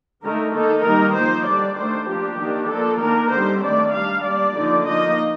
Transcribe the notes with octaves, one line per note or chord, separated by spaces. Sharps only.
D3 A3 D#4 A#4
D#3 A#3 D#4 A4
D#3 G3 A#3 D#4 A#4
F3 A#3 D#4 C5
D3 G3 D4 D5
D#3 A3 D4 C5
F3 A#3 D4 G4
D#3 A#3 D4
F3 A#3 D4 A4
D#3 A#3 D4 A#4
D3 G3 C4 D#4 C5
D#3 A3 D4 D5
G3 D4 F5
G3 A#3 D4 D5
D3 F3 A#3 D#4
F3 A#3 D#4 D#5